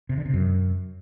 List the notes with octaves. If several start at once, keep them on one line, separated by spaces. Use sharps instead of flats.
C3
D3
C3
F#2